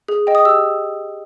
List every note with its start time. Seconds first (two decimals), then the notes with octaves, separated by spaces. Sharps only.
0.08 G#4
0.27 D#5 G5
0.35 D#6
0.45 G4 E6